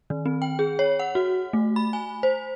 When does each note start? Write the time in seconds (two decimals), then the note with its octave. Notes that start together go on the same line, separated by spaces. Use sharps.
0.10 D#3
0.26 C4
0.42 G5
0.59 G#4
0.79 C#5
1.00 F#5
1.15 F#4
1.53 A3
1.76 B5
1.93 G#5
2.23 C5